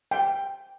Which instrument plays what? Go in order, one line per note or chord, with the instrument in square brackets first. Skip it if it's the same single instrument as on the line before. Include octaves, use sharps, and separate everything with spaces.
[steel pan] G5